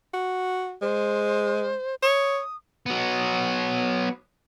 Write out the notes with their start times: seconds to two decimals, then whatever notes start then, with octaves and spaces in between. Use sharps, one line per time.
0.14 F#4
0.82 G#3 C5
2.03 C#5 D#6
2.86 F#3 B3